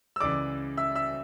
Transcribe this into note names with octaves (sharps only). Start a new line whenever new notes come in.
E6
C#2 C#3 E3 D5 D6
E5 E6
E5 E6